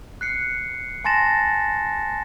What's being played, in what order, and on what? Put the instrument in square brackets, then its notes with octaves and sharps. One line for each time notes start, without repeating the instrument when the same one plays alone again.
[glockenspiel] F#6 C7 C#7
G#5 A5 C6 A6 A#6 E7